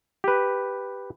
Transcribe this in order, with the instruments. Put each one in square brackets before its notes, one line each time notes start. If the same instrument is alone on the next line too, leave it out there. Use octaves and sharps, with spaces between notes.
[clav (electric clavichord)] G4 B4